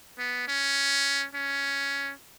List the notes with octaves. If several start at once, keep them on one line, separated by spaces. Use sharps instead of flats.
B3
C#4
C#4